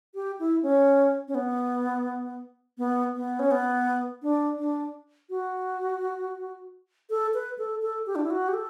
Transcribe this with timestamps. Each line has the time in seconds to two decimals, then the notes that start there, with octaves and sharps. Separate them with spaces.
0.15 G4
0.39 E4
0.63 C#4
1.28 C#4
1.35 B3
2.78 B3
3.15 B3
3.39 C#4
3.51 B3
4.23 D4
4.58 D4
5.30 F#4
7.10 A4
7.34 B4
7.58 A4
7.82 A4
8.06 G4
8.16 D4
8.24 E4
8.30 F#4
8.48 G4
8.54 A4